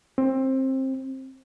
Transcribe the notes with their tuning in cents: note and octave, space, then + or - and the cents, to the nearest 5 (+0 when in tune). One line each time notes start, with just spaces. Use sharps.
C4 +20